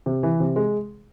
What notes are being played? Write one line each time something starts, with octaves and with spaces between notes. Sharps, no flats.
C3
E3
C3
G#3